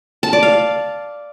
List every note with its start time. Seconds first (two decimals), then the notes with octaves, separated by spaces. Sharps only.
0.23 A5
0.33 D5
0.43 F5